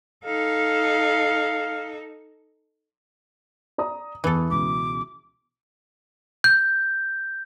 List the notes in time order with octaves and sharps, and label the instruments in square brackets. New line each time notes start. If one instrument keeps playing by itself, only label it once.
[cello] D#4 A4 [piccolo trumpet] F5
[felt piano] D5 A#5 D#6
[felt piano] E2 [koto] E3 A4
[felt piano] C#2 B2 [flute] D6
[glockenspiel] G6